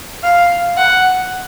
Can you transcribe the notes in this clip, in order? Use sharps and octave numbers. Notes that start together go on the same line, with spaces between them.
F5
F#5